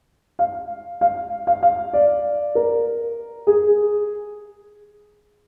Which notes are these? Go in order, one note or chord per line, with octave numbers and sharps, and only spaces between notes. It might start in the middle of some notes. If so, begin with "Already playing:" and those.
F5
F5
F5
F5
D5
A#4
G#4